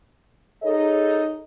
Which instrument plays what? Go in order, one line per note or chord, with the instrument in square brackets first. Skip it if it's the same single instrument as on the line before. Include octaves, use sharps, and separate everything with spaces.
[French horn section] D#4 G#4 A4 C#5 D#5